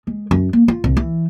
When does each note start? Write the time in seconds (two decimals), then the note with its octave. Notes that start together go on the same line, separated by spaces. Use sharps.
0.07 G#3
0.31 F#2
0.53 A#3
0.68 F4
0.84 C2
0.97 E3